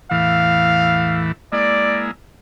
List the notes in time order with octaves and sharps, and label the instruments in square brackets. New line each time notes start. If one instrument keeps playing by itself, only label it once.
[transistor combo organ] E2 A2 E3 [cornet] F5
[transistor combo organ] G#3 A#3 E4 [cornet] D5